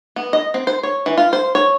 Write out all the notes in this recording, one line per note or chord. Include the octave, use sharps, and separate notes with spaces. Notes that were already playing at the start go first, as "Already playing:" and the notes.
B3
D#5
C4
C5
C#5
E3
F4
C5
C#5